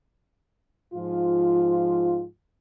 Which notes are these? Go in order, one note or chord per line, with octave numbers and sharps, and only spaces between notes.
G#2 F3 F4